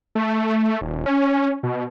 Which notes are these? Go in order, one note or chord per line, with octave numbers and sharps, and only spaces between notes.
A3
D#1
C#4
B2